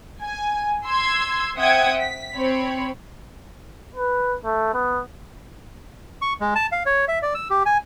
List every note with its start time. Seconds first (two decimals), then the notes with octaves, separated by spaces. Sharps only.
0.21 G#5
0.85 C6 E6 G#6
1.56 C4 E5 F#5 G5 D#6 G#6
1.99 B6
2.35 C4 C#5 B5
3.95 B4
4.44 A3
4.74 B3
6.22 C#6
6.41 G#3
6.55 A5
6.72 F5
6.86 C#5
7.08 E5
7.22 D5
7.34 E6
7.50 G4
7.66 G#5